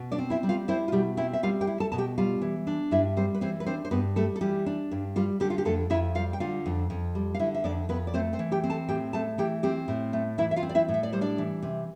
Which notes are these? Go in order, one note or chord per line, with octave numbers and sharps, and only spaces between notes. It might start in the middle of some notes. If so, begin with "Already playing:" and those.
Already playing: B2
D4 D5
C4
E4 E5
G3
F4 F5
C4 E4 C5
F4
B2 G3 G4
C4 E4 E5
E5
G3 F4 F5
G4 G5
E4
A4 A5
B2 A5
G4 G5
G3 F4 F5
E3
D4
G2 E4 E5
G3 C4 C5
B4
E3 C4 C5
B4
C4 D4 C5
C5
G2 B3 B4
G3 A3 A4
A4
E3 G3 G4
D4
G2
G3 F4
D3 G3 G4
F4
G4
F2 A3 A4
F2 E4 E5
G3 F4 F5
G5
D3 F4 F5
F2
F2
G3
F5
D3 E4 E5
E5
F2 D4 D5
F2 B3 B4
D5
A3 C4 C5
C4 C5
E3
G4 G5
C4
A4 A5
A2 G4 G5
A3 A4 A5
E3 G4 G5
C4 G4 G5
A2
A3
E3 E4 E5
E5
F4 F5
C4
D5
E4 E5
A2
E5
D5
G3 C5
D4 D5
E3
C3